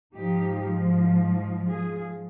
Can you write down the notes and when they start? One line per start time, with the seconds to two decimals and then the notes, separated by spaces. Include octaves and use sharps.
0.15 G#2 F3 D#4 G4
1.66 F4 G#4